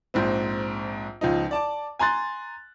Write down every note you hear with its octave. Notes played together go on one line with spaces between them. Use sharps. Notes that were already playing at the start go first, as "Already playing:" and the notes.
A#1 G#2 C4
C#2 F3 D#4
D5 A5 D6
G#5 A#5 C6 F#6 A6